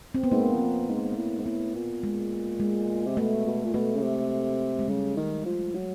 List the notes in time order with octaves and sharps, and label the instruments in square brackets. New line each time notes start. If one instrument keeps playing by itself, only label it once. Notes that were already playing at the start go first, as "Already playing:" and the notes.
[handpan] C4
B3
[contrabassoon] G#2 [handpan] A#3
[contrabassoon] E2
F2
G#2
A2
G#2
[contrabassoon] A2 [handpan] B3
[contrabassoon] A#2
[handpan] G#3
G#3
[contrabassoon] C3
[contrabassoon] B2 [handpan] A3
[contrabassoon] B2
A#2
[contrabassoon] B2 [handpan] A3
[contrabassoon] C#3
C3
[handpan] G#3
[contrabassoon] C#3 [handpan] G3
[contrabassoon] D#3
F3
F#3